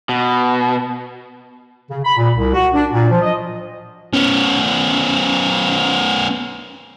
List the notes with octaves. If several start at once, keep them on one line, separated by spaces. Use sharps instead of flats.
B2
C#3
B5
A#2
C2
F#4
D4
A#2
F3
D#5
B3 C#4